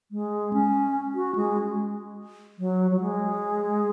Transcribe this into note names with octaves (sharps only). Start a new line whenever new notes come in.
G#3
C#4
F#4
G#3
F#3
F#3
G#3